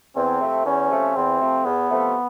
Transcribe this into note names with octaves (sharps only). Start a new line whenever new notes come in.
E2 C4
C3 F3 A3
E2 C#4
C3 F3 A3
E2 C4
C3 F3 A3
E2 B3
C3 F3 A3